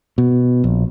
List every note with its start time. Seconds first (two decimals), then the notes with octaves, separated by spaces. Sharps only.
0.18 B2
0.64 A#1